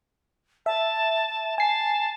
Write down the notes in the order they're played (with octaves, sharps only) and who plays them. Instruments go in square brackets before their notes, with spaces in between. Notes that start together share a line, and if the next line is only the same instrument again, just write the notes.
[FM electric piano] E5 [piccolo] A5
[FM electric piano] G#5 C7 [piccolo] A5